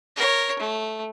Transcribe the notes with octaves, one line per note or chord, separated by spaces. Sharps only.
A#4 C#5
A3